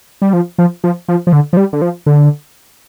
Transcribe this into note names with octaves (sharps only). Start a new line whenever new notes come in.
G3
F3
F3
F3
F3
F3
D3
F3
G3
D3
F3
D3